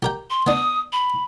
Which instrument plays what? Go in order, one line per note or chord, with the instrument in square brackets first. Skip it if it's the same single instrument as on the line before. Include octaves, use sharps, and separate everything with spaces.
[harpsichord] G4 A#4 G5
[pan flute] C6
[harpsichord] B3 D4 [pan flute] D#6
[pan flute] B5